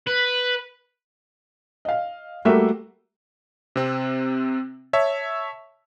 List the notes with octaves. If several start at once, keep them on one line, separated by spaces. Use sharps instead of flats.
B4
D#5 F5
G3 A3 A#3 F#4 E5
C3 C4
C#5 E5 A5